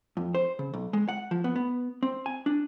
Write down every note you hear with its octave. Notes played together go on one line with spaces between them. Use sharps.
F2
C5
C#3
B1
G#3
F#5
F3
B3
B3
C4
G#5
D4